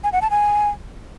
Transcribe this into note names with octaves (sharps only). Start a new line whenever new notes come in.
G#5
F#5
A5
G#5